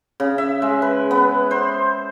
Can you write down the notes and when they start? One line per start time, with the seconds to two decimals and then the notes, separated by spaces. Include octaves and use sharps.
0.20 C#3
0.38 E5
0.62 G#3
0.82 B4
1.11 B3
1.51 C5